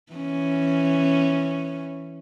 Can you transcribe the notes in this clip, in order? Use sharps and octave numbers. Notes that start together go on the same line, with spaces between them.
E3 C#4